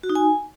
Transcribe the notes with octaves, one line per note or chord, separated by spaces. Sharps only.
F#4
D#4
G#5